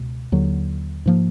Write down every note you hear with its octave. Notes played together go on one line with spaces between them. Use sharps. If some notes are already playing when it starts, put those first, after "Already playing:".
Already playing: C#2 B2
D#2 D3 F#3
G#2 F3 A#3